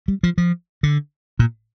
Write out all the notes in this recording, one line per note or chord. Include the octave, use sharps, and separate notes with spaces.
G3
F3
F3
D3
A#2